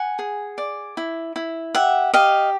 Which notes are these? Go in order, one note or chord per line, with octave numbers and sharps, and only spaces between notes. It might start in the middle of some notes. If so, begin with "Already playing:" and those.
Already playing: F#5 G#5
G#4
D5
E4
E4
G4 E5 F#5
G4 D#5 F5